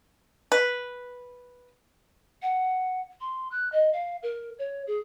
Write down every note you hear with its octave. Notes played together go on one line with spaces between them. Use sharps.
B4
F#5
C6
F#6
D#5
F5
A#4
C#5
G#4